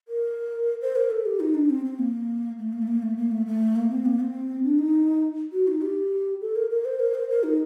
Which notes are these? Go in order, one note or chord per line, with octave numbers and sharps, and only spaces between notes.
A#4
C5
A#4
A4
G4
D#4
D4
C4
C4
A#3
A3
A#3
A3
A#3
A3
A#3
A3
A3
A#3
C4
A#3
C4
D4
D#4
F#4
D#4
G4
A4
A#4
A#4
C5
A#4
C5
A#4
D#4